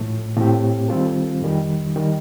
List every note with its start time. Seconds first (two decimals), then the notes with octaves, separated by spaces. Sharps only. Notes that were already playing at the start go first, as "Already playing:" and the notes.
Already playing: A2 F3 A3
0.36 A2 A3 C4 G4
0.88 D#3 G3 C4 F4 A4
1.42 F2 D#3 G3
1.96 D#3 G3